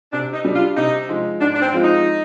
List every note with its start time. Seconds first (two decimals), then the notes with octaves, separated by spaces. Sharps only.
0.12 C3 D4
0.33 D#4
0.45 G3 D4
0.56 F4
0.77 C3 D#4
1.09 F3 G#3 D#4
1.41 G#2 D4
1.54 D4
1.62 C4
1.73 F3 G#3 C4 F4
1.84 D#4